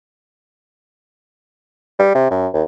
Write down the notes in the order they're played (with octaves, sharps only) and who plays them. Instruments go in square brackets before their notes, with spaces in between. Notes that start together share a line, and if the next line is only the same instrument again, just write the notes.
[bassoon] G3
C3
F#2
D#2